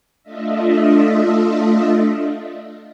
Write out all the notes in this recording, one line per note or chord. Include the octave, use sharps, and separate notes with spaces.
A3 D4 F4 D#5 E5